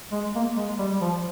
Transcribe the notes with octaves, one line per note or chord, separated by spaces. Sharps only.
G#3
A#3
G#3
G3
F3